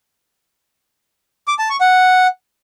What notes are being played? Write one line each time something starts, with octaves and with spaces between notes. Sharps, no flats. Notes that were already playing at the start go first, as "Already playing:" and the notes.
D6
A5
C#6
F#5